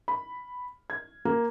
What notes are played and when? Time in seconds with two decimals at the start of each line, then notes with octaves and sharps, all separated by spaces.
0.08 B5
0.90 G#6
1.25 A#3